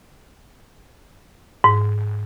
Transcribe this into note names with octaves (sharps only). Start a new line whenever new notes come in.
G#2